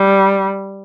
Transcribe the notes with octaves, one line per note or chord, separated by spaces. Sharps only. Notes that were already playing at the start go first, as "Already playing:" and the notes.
Already playing: G3